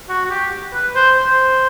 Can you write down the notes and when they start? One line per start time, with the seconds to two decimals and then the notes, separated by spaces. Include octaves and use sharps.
0.09 F#4
0.25 F#4
0.30 G4
0.73 B4
0.95 C5
1.16 C5